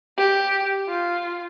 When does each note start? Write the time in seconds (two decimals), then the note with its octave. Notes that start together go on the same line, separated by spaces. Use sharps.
0.17 G4
0.88 F4